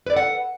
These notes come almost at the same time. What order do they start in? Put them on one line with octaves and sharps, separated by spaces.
B4 D5 A4 F#5